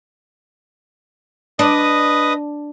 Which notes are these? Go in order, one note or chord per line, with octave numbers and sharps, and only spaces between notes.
D4 B4 D#5 D#6